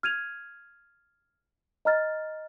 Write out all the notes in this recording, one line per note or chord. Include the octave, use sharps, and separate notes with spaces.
F6 G#6 D#7 F7
D#5 A#5 F6 A6